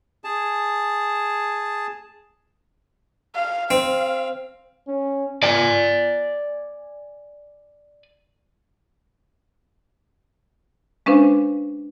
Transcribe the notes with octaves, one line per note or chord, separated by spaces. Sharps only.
G#4 A5
F5
C4 F5
C#4
D5 G#5
G#3 C#4 D4 B4 C5 F5